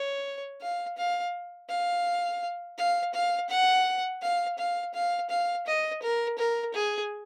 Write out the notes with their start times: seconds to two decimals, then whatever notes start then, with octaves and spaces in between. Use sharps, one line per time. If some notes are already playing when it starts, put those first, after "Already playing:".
Already playing: C#5
0.61 F5
0.98 F5
1.69 F5
2.78 F5
3.14 F5
3.50 F#5
4.22 F5
4.58 F5
4.94 F5
5.30 F5
5.67 D#5
6.02 A#4
6.38 A#4
6.74 G#4